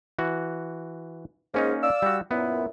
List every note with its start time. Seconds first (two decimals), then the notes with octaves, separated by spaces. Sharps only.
0.19 E3 F#4
1.54 G#2 A#3 C#4 D#4
1.83 D5 F5 E6
2.02 G3 F#4
2.31 F#2 A#2 B3 E4